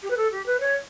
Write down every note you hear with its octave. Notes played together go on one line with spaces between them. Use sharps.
G4
B4
A4
G4
B4
C#5